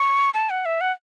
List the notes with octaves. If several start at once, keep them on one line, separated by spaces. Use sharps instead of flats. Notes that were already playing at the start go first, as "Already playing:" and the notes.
Already playing: C#6
A5
F#5
E5
F#5